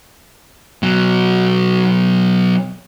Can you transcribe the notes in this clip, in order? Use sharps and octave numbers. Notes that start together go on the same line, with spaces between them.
B2 F#3